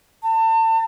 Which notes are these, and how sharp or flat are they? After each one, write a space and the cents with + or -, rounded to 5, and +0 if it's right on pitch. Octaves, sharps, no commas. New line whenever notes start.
A5 +35